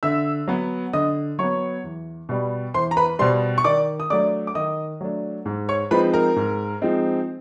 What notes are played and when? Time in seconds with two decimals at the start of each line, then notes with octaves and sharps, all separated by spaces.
0.03 D3 E5 E6
0.48 F#3 B3
0.93 D3 D#5 D#6
1.39 F#3 B3 C#5 C#6
1.84 E2
2.29 B2 G3
2.74 E2 C5 C6
2.91 A#5
2.97 B4 B5
3.19 B2 G3 C5 C6
3.58 C#6
3.64 D#3 D5 D6
4.00 D#6
4.10 F#3 A3 D4 D5 D6
4.47 D6
4.55 D#3 D#5 D#6
5.01 F#3 A3 D4
5.45 G#2
5.69 C#5 C#6
5.91 F3 G#3 C4 D#4 B4 B5
6.13 A#4 A#5
6.36 G#2
6.82 F3 G#3 C4 D#4